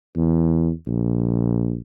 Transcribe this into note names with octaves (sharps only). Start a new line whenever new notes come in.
E2
A#1